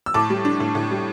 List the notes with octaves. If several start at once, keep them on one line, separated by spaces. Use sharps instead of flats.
E6
A2 A5 D6
G3
D4
A2
A2
G3